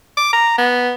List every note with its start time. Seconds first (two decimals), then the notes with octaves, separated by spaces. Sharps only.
0.17 D6
0.33 A#5
0.58 B3